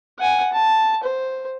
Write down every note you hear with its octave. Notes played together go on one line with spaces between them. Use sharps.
F#5 G#5
A5
C5